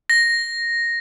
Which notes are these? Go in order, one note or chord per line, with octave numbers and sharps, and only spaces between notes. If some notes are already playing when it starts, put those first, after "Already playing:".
A#6